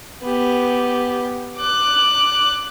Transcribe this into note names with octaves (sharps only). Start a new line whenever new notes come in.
B3 G4
D6 F#6